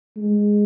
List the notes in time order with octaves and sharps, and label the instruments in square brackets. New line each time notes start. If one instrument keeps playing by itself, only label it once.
[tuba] G#3